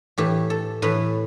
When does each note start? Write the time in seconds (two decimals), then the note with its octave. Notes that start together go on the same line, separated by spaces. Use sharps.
0.18 A2 E3 G4
0.50 A4
0.82 A2 E3 B4